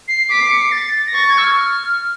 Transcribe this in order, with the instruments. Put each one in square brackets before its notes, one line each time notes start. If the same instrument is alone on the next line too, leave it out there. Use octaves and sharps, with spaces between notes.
[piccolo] C7
[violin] D6 [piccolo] B6
[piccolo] C7
C#7
C7
A6
A#6
[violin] C#6 [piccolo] A6
[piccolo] G#6
E6
F6